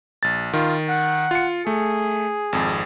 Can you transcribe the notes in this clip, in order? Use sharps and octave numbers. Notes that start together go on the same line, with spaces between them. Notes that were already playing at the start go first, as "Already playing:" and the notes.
A#1 A6
D#3 F4
F#5
F4 C#7
A3 G#4
G#1 F2